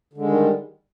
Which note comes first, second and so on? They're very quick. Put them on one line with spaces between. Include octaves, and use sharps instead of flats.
D3 G#3 D#3 G3